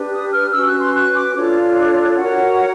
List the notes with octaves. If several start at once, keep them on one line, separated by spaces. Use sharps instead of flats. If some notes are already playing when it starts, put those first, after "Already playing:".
Already playing: D4 G4 B4
D#6
F6
C#4 F#4 B4 E6
F#6
C6
F#6
D6
D4 F4 A4 C#5
F#4 A#4 C#5 F#5